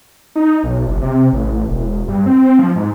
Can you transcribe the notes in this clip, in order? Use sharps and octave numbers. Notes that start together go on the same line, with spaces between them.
D#4
B1
F#1
C3
A1
A1
E1
G2
C4
C4
F3
G#2